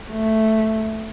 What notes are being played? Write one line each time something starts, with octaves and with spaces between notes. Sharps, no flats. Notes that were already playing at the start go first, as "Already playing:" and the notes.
A3